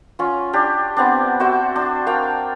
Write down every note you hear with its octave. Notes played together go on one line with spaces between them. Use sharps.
C#4 F4
D4 G4
B3 C4 D4
F#4 C5 D5 E5
D4
A#4 F5 G5